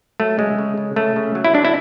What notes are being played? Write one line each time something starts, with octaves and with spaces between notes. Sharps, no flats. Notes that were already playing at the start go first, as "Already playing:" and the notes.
F#3 A3
C#3 G#3
C#3
C#3
C#3 A3
C#3
F#3
E4
F#3 D4
E4